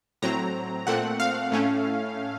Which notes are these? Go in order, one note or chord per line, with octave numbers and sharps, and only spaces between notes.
A2 F#3 C4 A#5
A#2 A3 C4 F#5
F5
A2 A3 C#4